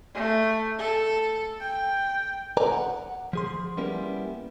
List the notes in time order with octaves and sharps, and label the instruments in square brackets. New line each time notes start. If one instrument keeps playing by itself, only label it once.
[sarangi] A3
A4
G5
[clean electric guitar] A#4 B4 D5 G#5 A#5
F#5
F3 G#4 C6
G3 A#3 B3 C#4 E4 A#4